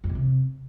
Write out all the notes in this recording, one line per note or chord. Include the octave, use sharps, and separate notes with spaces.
F2
B2
C3